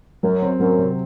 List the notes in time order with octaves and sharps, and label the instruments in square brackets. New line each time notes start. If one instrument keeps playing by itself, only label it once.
[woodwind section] F#2 [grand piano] F#3
[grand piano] C4
[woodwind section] F#2 [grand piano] F#3
[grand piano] C3